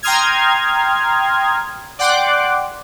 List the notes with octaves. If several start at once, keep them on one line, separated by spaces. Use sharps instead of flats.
G5 A#5 C6 D#6 F6 G#6
D5 F#5 G5 C6 D6 F#6